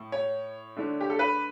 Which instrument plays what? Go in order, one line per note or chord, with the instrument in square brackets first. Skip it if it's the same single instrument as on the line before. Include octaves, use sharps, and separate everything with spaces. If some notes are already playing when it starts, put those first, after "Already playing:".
Already playing: [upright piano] A2
C#5
D3 A3 D4
G4
A4
B4